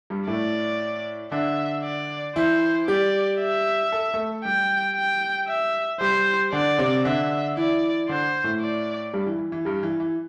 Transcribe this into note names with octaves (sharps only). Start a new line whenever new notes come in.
G2 G3
A2 A3 D5
D3 D4 E5
D5
E3 E4 C5
G3 G4 D5
E5
A4
A3 A4
G3 G4 G5
G5
E5
G3 G4 C5
D3 D4 D5
C3 C4
D3 D4 E5
E3 E4 D5
D3 D4 C5
A2 A3
D5
G2 G3
E3
E3
E3
G2 G3
E3
E3